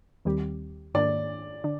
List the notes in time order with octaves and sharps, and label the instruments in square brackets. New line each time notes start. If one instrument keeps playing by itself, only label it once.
[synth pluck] D#2 D#3 G3 C4 G4
[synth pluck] G#2 D#3 A#3 D4 [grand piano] D5
[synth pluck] D3 D4